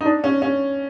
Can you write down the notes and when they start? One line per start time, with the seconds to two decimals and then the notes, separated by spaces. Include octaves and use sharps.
0.01 D#4
0.06 D4
0.24 C#4
0.42 C#4